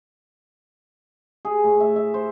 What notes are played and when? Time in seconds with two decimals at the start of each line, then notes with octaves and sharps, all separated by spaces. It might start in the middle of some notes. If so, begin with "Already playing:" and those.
1.45 G#4
1.64 A2
1.80 E5
1.96 E5
2.14 C5